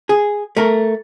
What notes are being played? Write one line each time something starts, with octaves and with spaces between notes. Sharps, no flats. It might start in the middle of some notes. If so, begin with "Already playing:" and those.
G#4
A3 A#4